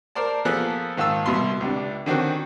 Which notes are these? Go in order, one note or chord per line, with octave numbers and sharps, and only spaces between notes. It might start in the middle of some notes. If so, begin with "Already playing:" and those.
A#4 C5 D5 A5
F3 A#3 B3 G#4 A4 F#6
G#2 D#3 F4 A5 E6
C2 B2 B5 C6
C#2 C3 D4
D3 D#3 C4 C#4 F#4